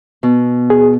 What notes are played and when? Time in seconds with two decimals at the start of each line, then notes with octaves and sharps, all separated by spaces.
0.23 B2
0.70 G#4